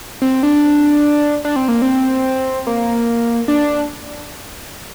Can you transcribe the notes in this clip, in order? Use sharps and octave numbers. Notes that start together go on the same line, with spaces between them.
C4
D4
D4
C4
A#3
C4
A#3
D4